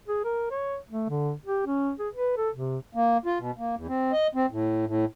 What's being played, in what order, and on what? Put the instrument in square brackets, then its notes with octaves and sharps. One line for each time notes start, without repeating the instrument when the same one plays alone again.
[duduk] G#4
A#4
C#5
A3
D3
G4
C#4
G#4
B4
A4
C3
[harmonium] A#3
F4
B2
A#3
E2
C4
D#5
C4
A2
A2